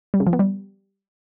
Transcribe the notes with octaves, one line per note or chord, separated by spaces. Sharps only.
G3
C#3
F3
B3
G3